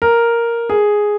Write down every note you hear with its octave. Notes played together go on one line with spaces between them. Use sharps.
A#4
G#4